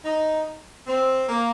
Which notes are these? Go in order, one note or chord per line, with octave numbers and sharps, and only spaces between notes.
D#4
C4
A#3